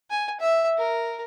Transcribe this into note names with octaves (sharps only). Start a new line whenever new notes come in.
G#5
E5
A#4